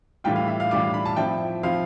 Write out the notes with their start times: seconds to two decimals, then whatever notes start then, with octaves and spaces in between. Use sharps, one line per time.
0.24 A2 E3 G3 D4 F4 G5
0.36 F5
0.48 E5
0.60 F5
0.71 A2 E3 G3 D4 F4 D6
0.94 B5
1.05 A5
1.16 F3 C4 E4 G5
1.63 F3 C4 E4 F5